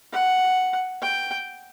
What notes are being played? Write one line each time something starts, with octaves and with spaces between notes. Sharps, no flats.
F#5
G5